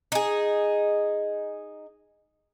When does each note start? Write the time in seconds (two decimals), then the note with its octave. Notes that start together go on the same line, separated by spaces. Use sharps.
0.12 D#4 G#4